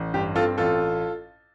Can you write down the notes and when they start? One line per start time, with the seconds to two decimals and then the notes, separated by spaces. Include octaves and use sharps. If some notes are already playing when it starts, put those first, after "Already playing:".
Already playing: A1
0.14 G2 G4
0.36 C4 F4 A4
0.58 A1 F4 A4